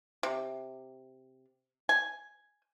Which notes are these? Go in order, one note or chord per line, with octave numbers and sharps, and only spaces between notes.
C3
G#5